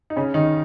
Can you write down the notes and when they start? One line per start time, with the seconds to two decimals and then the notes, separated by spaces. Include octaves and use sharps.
0.10 D#4
0.16 C#3 C#4
0.34 D#3 D#4